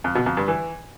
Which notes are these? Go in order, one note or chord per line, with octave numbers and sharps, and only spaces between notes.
F2
B2
F2
G2
E3